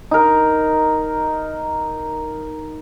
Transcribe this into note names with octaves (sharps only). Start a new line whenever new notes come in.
D#4 A#4